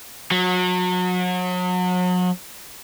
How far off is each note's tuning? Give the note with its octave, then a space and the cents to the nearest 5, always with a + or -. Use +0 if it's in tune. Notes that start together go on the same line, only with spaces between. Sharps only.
F#3 -35